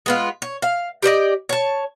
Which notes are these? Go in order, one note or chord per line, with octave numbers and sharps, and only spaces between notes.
G#3 B3 F4
C#5
F5
G4 C5 D5 D#5
C#5 A5